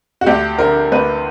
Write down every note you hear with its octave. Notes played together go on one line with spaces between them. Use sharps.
F#4
D2 G4
D3 A#4
D2 B4